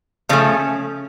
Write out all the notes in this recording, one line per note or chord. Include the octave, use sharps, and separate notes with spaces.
C#3 F3 A3 C#4